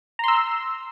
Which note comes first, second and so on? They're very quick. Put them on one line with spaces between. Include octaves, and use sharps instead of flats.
A#5 C6 E6